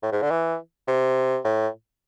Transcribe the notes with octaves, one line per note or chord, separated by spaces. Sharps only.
A2
G#2
D3
E3
C3
A2